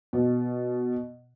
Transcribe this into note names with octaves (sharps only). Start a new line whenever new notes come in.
B2